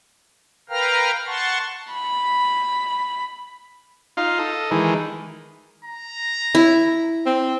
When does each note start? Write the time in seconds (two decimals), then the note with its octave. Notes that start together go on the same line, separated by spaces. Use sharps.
0.69 A#4 B4 F5 G5 A#5 F6
1.27 F#5 A5 C6 C#6
1.92 B5
4.17 D#4 F4 F5
4.39 A4 D#5
4.71 D#3 E3 G#3
5.85 A#5
6.55 E4
7.26 C4